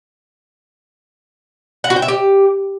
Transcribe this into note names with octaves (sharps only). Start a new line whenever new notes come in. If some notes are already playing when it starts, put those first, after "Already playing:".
F#5
F#4
G5
E5
G4